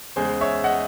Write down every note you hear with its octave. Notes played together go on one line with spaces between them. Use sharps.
E2 C#3 G#3 G#4 C5
C#5 E5
D#5 F#5